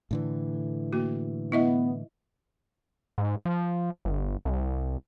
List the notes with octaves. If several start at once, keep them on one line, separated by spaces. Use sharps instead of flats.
A2 D3 E3
A#3 F#4
B3 E4 D#5 E5
G#2
F3
G1
C2